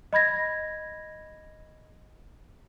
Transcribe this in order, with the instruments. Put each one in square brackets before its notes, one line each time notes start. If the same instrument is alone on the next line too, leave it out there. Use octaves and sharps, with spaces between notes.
[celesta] D#5 B5 G#6 A#6